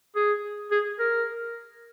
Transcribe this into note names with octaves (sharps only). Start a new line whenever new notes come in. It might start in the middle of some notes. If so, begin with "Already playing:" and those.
G#4
G#4
A#4